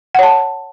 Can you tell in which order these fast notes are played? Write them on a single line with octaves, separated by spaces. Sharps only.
F#5 C#5 A5